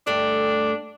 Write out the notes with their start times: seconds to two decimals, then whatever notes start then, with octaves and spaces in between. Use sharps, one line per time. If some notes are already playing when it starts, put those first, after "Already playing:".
0.07 G2 A3 D4 G4